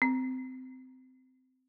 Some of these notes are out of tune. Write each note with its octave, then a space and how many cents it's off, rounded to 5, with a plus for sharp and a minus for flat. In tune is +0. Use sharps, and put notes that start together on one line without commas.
C4 -25